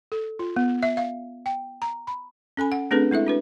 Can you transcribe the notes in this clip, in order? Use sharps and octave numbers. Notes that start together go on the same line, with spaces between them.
A4
F4
B3
E5
F5
G5
A#5
B5
C#4 A4 G#5 B5
F#5
A3 C4 D4 G#4 A4 B4
G#3 E4 A4 E5
D4 F#4 B4